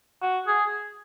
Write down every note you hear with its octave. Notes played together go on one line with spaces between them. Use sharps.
F#4
G#4